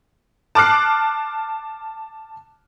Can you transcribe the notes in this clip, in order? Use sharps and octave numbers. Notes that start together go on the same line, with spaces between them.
A5 D6 F6 F#6 C7